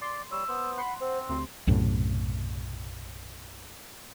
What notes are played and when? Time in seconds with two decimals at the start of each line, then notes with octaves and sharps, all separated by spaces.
0.01 D5 C6
0.32 G3 C#5 E6
0.48 B3 C5
0.78 F#5 B5 C6
1.01 C4 C5
1.29 D2 C3 C6
1.67 B1 F#2 A2 C3